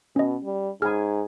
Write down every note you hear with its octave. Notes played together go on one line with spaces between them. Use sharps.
B2 C#4 D#5
G3
G#2 G#4 G#5 B5 F6